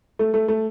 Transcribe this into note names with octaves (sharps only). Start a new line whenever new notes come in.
A3
A3
A3